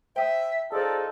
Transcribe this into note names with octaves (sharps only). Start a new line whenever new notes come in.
C5 E5 G5 D#6
D#4 F4 G#4 A4 C5 D5